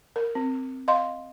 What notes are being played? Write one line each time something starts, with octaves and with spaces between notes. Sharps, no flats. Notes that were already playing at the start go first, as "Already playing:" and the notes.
A#4
C4
D#5 F5 C6